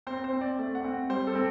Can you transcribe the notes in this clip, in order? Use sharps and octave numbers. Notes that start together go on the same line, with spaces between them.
C4 C5
C5
C4
D5
A3
F#5
C4
G3 C5
A4
C4